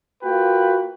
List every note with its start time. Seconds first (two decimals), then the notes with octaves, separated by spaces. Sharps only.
0.23 A#3 F4 F#4 B4 G5